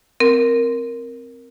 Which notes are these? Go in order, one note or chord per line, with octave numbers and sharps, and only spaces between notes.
C4 A#4